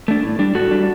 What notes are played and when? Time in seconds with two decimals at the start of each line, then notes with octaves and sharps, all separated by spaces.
0.08 A3 D4
0.23 A2
0.39 G3 D4
0.55 A2 F#4 A4
0.71 G3 D4